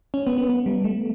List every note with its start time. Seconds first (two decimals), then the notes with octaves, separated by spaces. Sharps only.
0.14 C#4
0.27 B3
0.38 B3
0.50 B3
0.66 G3
0.84 A3